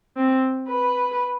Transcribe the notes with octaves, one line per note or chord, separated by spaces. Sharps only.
C4
B4